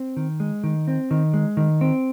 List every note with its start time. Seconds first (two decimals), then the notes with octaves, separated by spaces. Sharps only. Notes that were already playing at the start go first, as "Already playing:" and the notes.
Already playing: C4
0.17 D#3
0.40 G#3
0.64 D#3
0.88 C4
1.11 D#3
1.34 G#3
1.57 D#3
1.81 C4